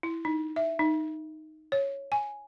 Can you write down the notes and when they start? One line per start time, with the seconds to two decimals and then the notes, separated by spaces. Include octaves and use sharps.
0.03 E4
0.25 D#4
0.56 E5
0.79 D#4
1.72 C#5
2.12 G#5